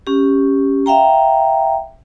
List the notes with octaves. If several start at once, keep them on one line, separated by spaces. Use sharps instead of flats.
C#4 G4
E5 F5 G5 A#5